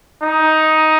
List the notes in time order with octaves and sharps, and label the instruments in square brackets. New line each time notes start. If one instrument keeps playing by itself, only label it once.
[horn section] D#4